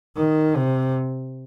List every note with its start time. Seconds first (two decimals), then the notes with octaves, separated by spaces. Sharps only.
0.16 D#3
0.56 C3